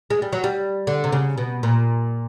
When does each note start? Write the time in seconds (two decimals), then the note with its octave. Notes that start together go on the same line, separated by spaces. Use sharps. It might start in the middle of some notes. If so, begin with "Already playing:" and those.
0.10 G#3
0.22 G3
0.33 F#3
0.44 G3
0.87 D3
1.04 C3
1.12 C#3
1.38 B2
1.63 A#2